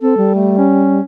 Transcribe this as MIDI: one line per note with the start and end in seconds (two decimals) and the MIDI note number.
0.01 0.17 60
0.01 0.33 69
0.17 1.00 55
0.35 0.56 57
0.58 1.02 61